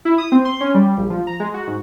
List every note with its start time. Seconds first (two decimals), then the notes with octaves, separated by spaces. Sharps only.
0.05 E4
0.18 D#6
0.32 C4
0.45 C6
0.61 C#4
0.74 G3
0.97 A#1
1.10 F3
1.27 A#5
1.40 G#3
1.54 F#4
1.67 G#2